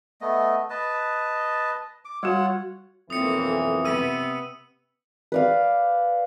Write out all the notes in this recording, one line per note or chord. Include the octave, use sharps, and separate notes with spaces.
A3 B3 D#5
B4 D#5 A5
D6
G3 F4 F#4 C#5 F#5
B1 F2 E3 A#3 C4 D#6 C#7
C3 B3 E6 D#7
B4 D5 F5